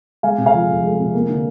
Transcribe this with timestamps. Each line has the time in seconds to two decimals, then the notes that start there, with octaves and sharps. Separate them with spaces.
0.23 G#3 F5 G#5
0.38 C3
0.46 F5 G#5
0.54 F3
0.69 F2
0.83 G#3
0.99 C3
1.14 A#3
1.29 D3